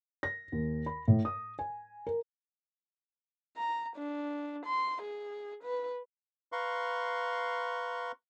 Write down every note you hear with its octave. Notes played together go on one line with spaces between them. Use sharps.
A#6
D#2
B5
A2
D#6
G#5
A#4
A#5
D4
C6
G#4
B4
B4 F5 A#5 C6 C#6